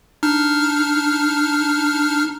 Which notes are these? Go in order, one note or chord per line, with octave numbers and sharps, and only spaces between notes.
D4 D#4 F6